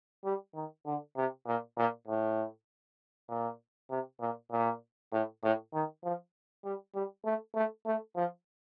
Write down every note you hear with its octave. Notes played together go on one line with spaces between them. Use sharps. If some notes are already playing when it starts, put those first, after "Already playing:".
G3
D#3
D3
C3
A#2
A#2
A2
A#2
C3
A#2
A#2
A2
A2
D#3
F3
G3
G3
A3
A3
A3
F3